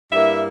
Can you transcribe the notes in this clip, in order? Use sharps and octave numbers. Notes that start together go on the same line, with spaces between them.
G2 G3 A#3 E4 E5